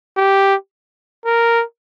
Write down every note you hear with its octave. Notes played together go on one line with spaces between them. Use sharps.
G4
A#4